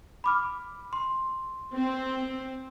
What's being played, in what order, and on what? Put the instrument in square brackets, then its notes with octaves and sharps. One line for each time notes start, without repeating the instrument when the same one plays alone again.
[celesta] B5 D6 F6
C6
[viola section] C4